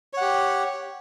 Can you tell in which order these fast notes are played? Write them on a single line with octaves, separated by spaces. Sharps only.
C#5 F#5 G4